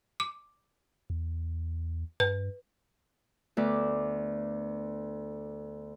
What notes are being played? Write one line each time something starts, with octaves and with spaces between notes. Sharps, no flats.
D6
E2
G2 B4
D2 B3 B4 D6